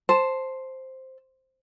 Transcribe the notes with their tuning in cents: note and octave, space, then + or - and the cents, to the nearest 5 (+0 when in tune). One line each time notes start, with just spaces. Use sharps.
C5 +0 A5 +0